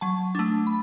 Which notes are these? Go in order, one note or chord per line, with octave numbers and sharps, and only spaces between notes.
F#3 A5
A3 D4
B5